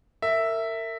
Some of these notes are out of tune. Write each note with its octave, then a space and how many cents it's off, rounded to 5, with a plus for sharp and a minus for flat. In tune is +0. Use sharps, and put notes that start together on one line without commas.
A#4 -35 E5 +0